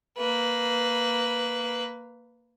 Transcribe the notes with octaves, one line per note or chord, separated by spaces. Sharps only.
A#3 B4